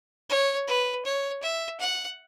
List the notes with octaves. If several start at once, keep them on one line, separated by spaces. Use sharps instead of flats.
C#5
B4
C#5
E5
F#5